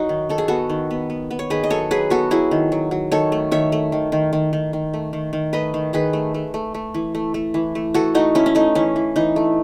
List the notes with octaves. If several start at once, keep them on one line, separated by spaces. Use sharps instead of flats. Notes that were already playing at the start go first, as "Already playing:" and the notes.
Already playing: F#3 D#4 F#4
D#3
D#3 A4
G#4
B3 F#4 A4
D#3
B3
B3
B3
C#5
D#3 G#4 B4
D#5
F#3 A4 C#5
F#3 G#4 B4
B3 F#4 A4
F#3 E4 G#4
D#3
F#3
F#3
D#3 A4 C#5
A3
D#3 C#5 E5
A3
D#3
D#3
D#3
D#3
D#3
A3
D#3
D#3
A3 B4 D#5
D#3
D#3 G#4 B4
A3
A3
A3
A3
E3
A3
A3
E3
A3
E3 F#4 A4
A3 D#4 F#4
A3 C#4 E4
C#4
A3 D#4
E3 C#4
E3
E3 D#4
A3